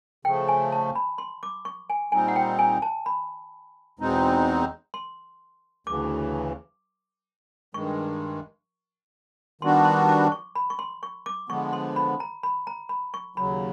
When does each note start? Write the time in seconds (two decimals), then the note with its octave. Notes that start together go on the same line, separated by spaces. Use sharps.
0.25 C#3 F3 A3 G5
0.48 G#5
0.72 A5
0.95 B5
1.18 C6
1.43 D6
1.65 C#6
1.90 G#5
2.12 A#2 G3 C4 D#4 G#5
2.28 F#5
2.36 G5
2.59 G#5
2.82 A5
3.06 B5
3.99 E2 B2 G#3 C4 D#4
4.94 C6
5.87 D2 C#3 E3 D6
7.74 G2 D#3 G#3 C#6
9.61 D#3 G3 B3 D4 F#4 C6
9.85 C6
10.09 D6
10.32 C#6
10.55 B5
10.70 C#6
10.79 C6
11.03 C#6
11.26 D6
11.49 D3 F3 G#3 B3 C#6
11.73 C6
11.96 B5
12.20 A#5
12.43 B5
12.67 A#5
12.89 B5
13.14 C#6
13.36 D#2 C#3 F#3 B5